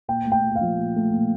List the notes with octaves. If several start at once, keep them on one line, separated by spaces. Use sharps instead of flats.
A#2 G5
A3
G5
A#2
F5
F3
A#2
A3
A#2